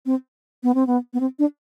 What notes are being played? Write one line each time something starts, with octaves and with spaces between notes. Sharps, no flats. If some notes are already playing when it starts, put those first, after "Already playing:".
C4
B3
C4
B3
B3
C4
D4